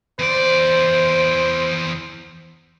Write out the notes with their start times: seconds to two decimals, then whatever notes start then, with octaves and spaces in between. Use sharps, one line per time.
0.19 E2 C5 D5